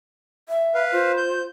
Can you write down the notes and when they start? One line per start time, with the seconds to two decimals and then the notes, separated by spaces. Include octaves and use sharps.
0.49 E5
0.74 B4 F5
0.92 F4 C5
1.17 G6